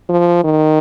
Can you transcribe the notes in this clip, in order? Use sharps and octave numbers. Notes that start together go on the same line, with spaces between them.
F3
D#3